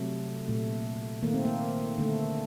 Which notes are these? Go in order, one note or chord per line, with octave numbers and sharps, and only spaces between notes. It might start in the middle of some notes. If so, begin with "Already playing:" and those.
Already playing: C3 F#3 A3
A#2 A3
D#3 A3 A#3
C4
A#3
D3 A3